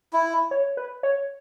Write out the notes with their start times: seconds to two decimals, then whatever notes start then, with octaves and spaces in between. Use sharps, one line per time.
0.13 E4
0.51 C#5
0.77 B4
1.03 C#5